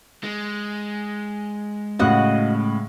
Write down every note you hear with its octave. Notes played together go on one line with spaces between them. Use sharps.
G#3
A2 C#3 F#4 D#5 F#5